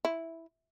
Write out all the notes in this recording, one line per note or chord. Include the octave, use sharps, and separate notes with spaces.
E4